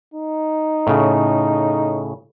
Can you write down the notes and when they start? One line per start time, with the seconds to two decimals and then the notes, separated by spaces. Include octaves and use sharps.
0.14 D#4
0.87 A2 C#3